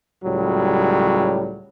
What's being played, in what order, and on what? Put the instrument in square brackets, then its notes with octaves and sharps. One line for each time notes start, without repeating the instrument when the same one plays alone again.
[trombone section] C#2 A2 F#3 G3